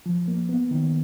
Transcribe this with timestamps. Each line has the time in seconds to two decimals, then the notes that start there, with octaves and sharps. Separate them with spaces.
0.06 F3
0.28 A#3
0.49 B3
0.71 D#3